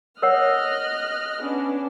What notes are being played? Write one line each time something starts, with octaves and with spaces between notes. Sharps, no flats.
A#4 C#5 D#5 F#5 F6 F#6
B3 C#4 D4